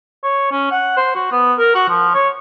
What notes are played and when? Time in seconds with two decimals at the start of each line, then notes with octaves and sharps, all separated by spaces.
0.23 C#5
0.51 C#4
0.71 F#5
0.97 C5
1.15 F#4
1.32 B3
1.58 A#4
1.75 F#4
1.89 F3
2.15 C#5